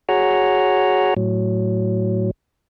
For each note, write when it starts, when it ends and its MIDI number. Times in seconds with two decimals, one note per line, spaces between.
0.09 1.14 66
0.09 1.14 68
0.09 1.14 73
0.09 1.14 78
0.09 1.14 82
1.17 2.31 45
1.17 2.31 54